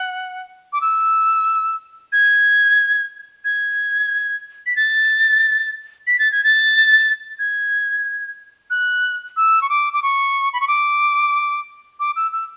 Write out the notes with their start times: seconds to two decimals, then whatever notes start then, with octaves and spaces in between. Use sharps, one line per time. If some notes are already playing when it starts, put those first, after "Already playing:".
Already playing: F#5
0.73 D6
0.81 E6
2.13 G#6
3.45 G#6
4.66 B6
4.76 A6
6.07 B6
6.19 A6
6.32 G#6
6.44 A6
7.39 G#6
8.70 F#6
9.37 E6
9.62 C#6
9.69 D6
9.93 D6
10.03 C#6
10.53 B5
10.60 C#6
10.68 D6
12.00 D6
12.16 E6
12.33 E6